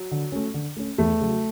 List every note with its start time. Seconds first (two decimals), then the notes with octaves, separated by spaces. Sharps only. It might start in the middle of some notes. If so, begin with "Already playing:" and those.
Already playing: F#3
0.11 D3
0.32 A3 C#4
0.54 D3
0.76 A3 C#4
0.98 E2 A3
1.20 C#3 F#3